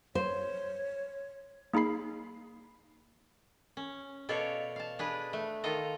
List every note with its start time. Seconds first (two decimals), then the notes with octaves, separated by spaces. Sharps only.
0.15 C5 C#5
1.74 A#3 D#4 G#4 B5 C7
3.77 C#4
4.29 B2 A4 C#5 D5 F5
4.76 F5 A5
4.99 D4 G#4 B4
5.33 A3
5.64 D#3 F4 A4 D#5 A#5